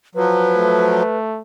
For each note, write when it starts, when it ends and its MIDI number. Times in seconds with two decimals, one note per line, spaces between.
0.15 1.03 53
0.15 1.03 54
0.15 1.17 71
0.55 1.41 57